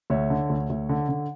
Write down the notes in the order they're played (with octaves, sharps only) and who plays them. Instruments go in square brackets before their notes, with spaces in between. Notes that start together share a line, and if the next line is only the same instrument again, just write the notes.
[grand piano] D2 C#5 E5
D3
D2
D2
D3
D3